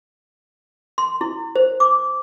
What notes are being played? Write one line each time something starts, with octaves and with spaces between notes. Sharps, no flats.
C6
E4
C5
D6